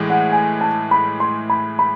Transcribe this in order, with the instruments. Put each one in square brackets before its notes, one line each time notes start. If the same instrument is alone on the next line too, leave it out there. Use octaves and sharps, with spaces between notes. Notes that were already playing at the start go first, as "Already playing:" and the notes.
Already playing: [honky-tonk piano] A2 E3 G#3
[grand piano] F#5
G#5
A5
B5
C6
B5
B5